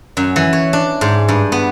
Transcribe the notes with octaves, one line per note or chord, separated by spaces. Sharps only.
F#2
E3
C#5
D4
G#2
G2
B3